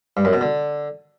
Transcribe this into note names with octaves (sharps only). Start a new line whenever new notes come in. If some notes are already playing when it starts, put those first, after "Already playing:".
G2
F#2
B2
D3